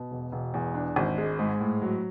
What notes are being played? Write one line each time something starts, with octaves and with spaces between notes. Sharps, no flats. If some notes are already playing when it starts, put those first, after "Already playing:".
Already playing: B2
E1
E1
E2
D4
G#1
G#3
G#2
A2
F#3